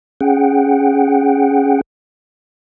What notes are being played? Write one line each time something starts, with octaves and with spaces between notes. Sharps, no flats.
C#4 G#4 F#5 G5